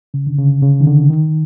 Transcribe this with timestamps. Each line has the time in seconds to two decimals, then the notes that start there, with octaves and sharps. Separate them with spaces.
0.14 C#3
0.27 D3
0.38 C#3
0.62 C#3
0.81 D#3
0.87 D3
1.10 D#3